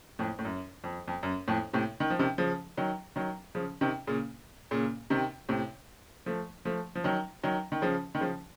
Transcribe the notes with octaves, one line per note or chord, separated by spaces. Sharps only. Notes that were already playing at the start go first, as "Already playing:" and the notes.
F2 A2
A2
F#2
F2
F2
F#2
F2 A2
A2 C3
D#3
F3
C3 D#3
C#3 F3
D#3 F#3
D#3 F#3
C#3 F3
C3 D#3
A#2 C#3
A#2 C#3
C3 D#3
A2 C3
F3 A3
F3 A3
F3
D#3 F#3
D#3 F#3
D#3
C#3 F3
D#3
C#3 F3